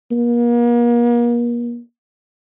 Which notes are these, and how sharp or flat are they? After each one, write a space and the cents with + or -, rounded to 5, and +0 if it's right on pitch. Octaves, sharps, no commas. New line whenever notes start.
A#3 +40